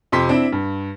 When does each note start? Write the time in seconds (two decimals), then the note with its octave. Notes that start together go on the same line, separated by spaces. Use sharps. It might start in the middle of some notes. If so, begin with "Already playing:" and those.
0.12 F2 C3 C6 B6
0.29 C4 D4 E4
0.52 G2